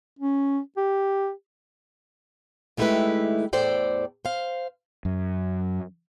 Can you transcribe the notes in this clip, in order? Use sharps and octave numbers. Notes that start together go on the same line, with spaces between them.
C#4
G4
D#3 G#3 A3 E4 G4 B4
E2 A2 A4 C5 D5 G5
C5 F5
F#2